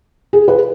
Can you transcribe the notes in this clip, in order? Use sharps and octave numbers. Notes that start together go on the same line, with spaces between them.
G#4
B4